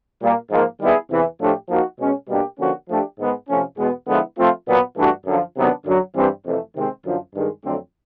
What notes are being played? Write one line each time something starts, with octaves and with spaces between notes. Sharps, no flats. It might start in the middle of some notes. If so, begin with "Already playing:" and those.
A#2 G3 A#3
G#2 F3 A#3
D#3 G3 B3 E4 G#4
E2 C3 E3
A2 F3 A3 D4 G4
F3 A#3 D#4 F#4
B2 G#3 C#4
B2 G3 A#3 D4 G4
D3 F3 A#3 C#4 F#4
F3 A3 D4 G4
G#2 D#3 G#3 B3
C3 F3 A3 C#4
E2 B2 G#3 B3
D3 F3 G#3 B3 E4
F3 A3 C4 F4
A#2 F#3 B3
G2 E3 A3 D4 F#4
F#2 D3 F3
C3 D#3 F#3 B3 D4
F#2 D3 F#3
G2 E3 G3 C4
F2 C3 E3 A3
C3 D#3 G#3 C4
F#2 D3 F3
G2 D#3 G#3
F2 D3 F#3 A3 C4